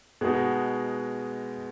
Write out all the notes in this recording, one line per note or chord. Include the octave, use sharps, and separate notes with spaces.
B2 G#3 B3 D#4 F#4